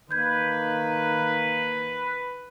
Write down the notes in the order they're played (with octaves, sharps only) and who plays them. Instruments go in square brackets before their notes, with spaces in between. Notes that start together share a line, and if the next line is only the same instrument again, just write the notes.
[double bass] D#3 [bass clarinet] A#3 [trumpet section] B4 [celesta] G6 G#6